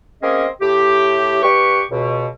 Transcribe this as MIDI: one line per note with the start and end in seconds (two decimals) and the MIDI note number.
0.22 0.47 58
0.22 0.47 60
0.22 0.47 61
0.22 0.47 68
0.22 0.47 75
0.61 1.39 45
0.61 1.39 67
1.43 1.82 43
1.43 1.82 67
1.43 1.82 71
1.43 1.82 85
1.90 2.27 37
1.90 2.27 47